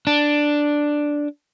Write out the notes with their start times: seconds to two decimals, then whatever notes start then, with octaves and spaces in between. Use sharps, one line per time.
0.07 D4